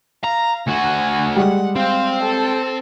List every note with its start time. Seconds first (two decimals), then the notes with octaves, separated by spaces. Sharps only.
0.24 F5 A#5
0.68 D2 F#4 G#5
1.36 G3 G#3 F#5
1.76 C4 F5
2.23 A4